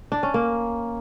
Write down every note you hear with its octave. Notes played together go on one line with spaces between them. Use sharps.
D4
C#4
A#3